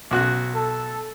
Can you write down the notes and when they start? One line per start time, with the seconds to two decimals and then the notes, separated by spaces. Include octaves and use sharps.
0.11 B1 F#4 F#6
0.55 A4